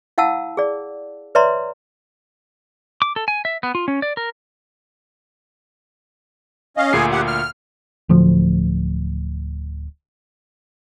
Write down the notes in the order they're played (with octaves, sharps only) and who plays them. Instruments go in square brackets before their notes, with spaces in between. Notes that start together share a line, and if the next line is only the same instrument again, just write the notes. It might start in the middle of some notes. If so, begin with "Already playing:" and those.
[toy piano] E4 F5 F#5 A5 E6
G#4 D5
B4 C#5 D5 E5 A#5 C6
[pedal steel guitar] D6
A4
G#5
E5
B3
F4
C#4
D5
A#4
[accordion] C#4 D#5 F5
[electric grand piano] D2 A#2 C7 [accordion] G#4 G#5
[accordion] G4 F#5
F6
[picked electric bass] D1 D2 F3